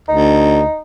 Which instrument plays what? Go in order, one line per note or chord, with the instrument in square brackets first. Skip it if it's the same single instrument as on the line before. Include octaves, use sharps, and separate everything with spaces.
[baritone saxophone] D2 [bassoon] D#4